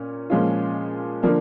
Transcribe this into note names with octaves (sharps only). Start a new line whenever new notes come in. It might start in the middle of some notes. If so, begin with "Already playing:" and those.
Already playing: A#2 C#4
A#2 F3 G#3 C#4 F4
D3 F3 A#3 D4